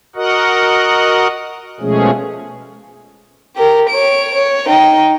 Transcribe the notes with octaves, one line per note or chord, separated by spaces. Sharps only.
F#4 A#4 D#5 F#5
B2 F3 G#3 A3 C#4 G#4
G4 A#4
C#5 D7
C#5
D#4 G5